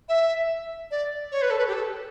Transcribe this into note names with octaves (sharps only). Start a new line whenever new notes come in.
E5
D5
C#5
B4
A4
B4
G4
A4